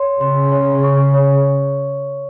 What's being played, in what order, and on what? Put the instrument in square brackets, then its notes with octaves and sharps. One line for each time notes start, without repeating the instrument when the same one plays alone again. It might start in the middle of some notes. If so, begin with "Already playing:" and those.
Already playing: [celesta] C#5 C6
[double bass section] C#3 [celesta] C6
[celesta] C#5
C#6
C#5